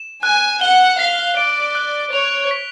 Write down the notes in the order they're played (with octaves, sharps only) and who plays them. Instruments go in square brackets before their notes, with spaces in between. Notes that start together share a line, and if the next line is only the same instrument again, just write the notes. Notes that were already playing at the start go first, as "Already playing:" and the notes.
Already playing: [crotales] E7
[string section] G#5 [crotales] F#6
[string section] F#5 [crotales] G7
[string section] F5 [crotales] B6
[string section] D5 [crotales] D7
[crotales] F#6
[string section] C#5 [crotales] F7
[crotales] B6